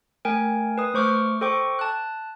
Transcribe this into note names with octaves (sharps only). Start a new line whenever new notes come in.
A3 A#4 G5 G#5
B4 D#6
A3 C5 C#6 D6 F6 G6
A4 C5 G5 C#6 D6
A5 F#6